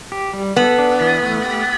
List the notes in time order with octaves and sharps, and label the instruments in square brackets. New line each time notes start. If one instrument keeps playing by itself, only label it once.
[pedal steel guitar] G4
G3
[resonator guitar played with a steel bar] B3 [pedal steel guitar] A4
[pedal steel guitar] D4
E3
A3
G4